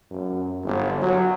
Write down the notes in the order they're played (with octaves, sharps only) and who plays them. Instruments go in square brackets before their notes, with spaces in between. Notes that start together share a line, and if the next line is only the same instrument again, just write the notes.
[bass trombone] F#2
G1
F#3